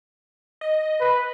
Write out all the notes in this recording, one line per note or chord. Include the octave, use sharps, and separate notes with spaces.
D#5
B4